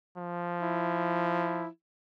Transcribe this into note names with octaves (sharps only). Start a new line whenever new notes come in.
F3
E4